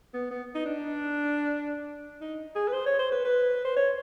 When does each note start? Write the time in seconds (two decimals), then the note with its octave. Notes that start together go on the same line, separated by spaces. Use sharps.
0.14 B3
0.31 B3
0.55 D#4
0.65 D4
2.21 D#4
2.55 G#4
2.68 B4
2.73 C5
2.86 C#5
2.99 C5
3.12 B4
3.24 B4
3.65 C5
3.76 C#5